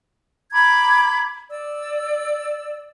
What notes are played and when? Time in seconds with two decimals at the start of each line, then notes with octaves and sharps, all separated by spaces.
0.52 A#5 B5 D6 G#6
1.49 D5 E6